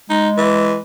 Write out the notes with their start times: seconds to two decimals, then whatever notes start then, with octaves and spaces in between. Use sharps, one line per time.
0.10 G#3 D#4
0.38 E3